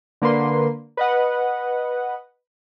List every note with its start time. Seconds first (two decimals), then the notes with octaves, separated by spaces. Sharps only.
0.22 D3 A#3 B4 C6
0.97 B4 D#5 F#5